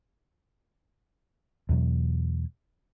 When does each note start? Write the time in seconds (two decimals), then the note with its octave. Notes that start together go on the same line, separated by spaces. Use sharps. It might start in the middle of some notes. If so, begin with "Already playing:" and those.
1.69 E2 B2 F#3